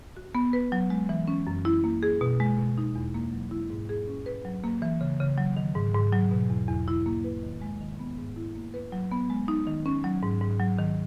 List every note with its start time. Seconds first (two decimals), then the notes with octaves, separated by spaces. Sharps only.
0.17 F#4
0.35 B3
0.53 B4
0.72 F#3
0.90 G#3
1.09 E3
1.28 C#4
1.47 F#2
1.65 E4
1.84 A#3
2.03 G#4
2.21 B2
2.40 G#3
2.59 B2
2.78 D#4
2.95 E2
3.14 A#3
3.33 F#3
3.51 E4
3.70 G#2
3.89 G#4
4.08 C#4
4.26 B4
4.45 F#3
4.64 A#3
4.82 E3
5.01 C#3
5.20 C#3
5.38 F#3
5.57 D#3
5.75 G#2
5.94 G#2
6.12 F#3
6.31 B2
6.50 E2
6.69 E2
6.88 E4
7.06 A#3
7.24 B4
7.43 D#3
7.62 G#3
7.81 D#3
7.99 B3
8.18 G#2
8.36 E4
8.55 A#3
8.74 B4
8.92 F#3
9.11 B3
9.30 G#3
9.48 D#4
9.67 D#3
9.86 C#4
10.04 F#3
10.23 G#2
10.41 G#2
10.60 F#3
10.79 D#3